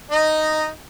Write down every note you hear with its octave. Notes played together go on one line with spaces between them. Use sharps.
D#4 D#5